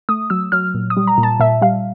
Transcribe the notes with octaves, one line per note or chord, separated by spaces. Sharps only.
A3 D#6
F#3 E6
F#3 F6
A#2
D#6
G3
A#5
A#2
A5
A#2 E5
G3 F5